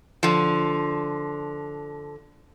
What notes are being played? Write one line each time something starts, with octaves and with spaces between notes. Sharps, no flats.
D3 F3